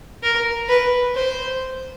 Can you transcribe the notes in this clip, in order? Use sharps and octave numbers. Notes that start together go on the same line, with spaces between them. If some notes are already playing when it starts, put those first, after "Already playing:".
A#4
B4
C5